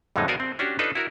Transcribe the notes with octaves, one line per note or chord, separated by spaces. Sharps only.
F2 A2 D3 F#3 G#3 D#4
B3 F#4 A#4 C5 D5 G#5
C4
C#4 D4 F#4 G4
D4 D#4 F4 A4 B4
E4 F#4 A#4